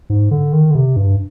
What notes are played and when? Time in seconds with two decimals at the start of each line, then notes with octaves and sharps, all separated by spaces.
0.10 G#2
0.31 D3
0.53 D#3
0.71 D3
0.75 C3
0.96 G2